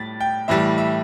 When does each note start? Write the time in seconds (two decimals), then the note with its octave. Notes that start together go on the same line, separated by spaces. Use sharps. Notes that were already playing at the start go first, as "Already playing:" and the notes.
Already playing: A2 G3 A6 B6
0.21 G5
0.48 A2 E3 G3 E5
0.78 E5